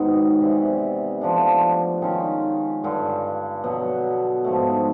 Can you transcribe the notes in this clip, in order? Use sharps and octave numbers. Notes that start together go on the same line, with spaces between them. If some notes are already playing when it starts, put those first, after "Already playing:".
Already playing: G#2 D#3 F#3 B3
C3 E3 G3 B3
F3 A3 D4
D#3 G#3 C#4 F4
G2 D3 G3
B2 F#3 B3
G#2 F3 A3